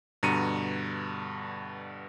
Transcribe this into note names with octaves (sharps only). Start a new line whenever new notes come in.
G2 B2 D3 A#5 C#7 D#7